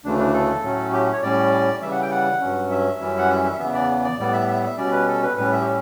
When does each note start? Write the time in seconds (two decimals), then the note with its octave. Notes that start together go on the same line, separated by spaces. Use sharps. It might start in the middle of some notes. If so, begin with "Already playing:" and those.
0.04 D2 C#3 E3 A3 D4
0.19 D4
0.34 A4
0.63 A2 F#3 A3 C#4
0.93 G4
1.13 C#5
1.23 A2 G3 C#4 D5
1.82 C#3 E3 G3 E5
1.92 F#5
2.02 G5
2.11 F#5
2.41 G2 F#3 C#4
2.71 E5
3.00 F#2 E3 G3 C#4
3.18 F#5
3.30 E5
3.44 E5
3.59 E2 C#3 E3 B3 E5
3.74 D5
4.04 D5
4.19 A2 G3 B3 D5
4.33 E5
4.48 E5
4.63 E5
4.77 B2 G3 C#4 D5
4.92 B4
5.07 A4
5.23 B4
5.37 A2 G3 C#4 B4
5.52 E5
5.62 G4